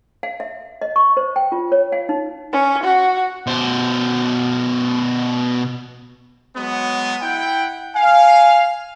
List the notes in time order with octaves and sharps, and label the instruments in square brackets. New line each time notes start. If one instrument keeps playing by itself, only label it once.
[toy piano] F5
E5
D#5
C#6
C5
G5
F4
C#5
F5
D#4
[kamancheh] C#4
F#4
[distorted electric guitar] B2 C5
[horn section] F#3 G#3 B3
E4 F#5 G5
[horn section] F5 [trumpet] G#5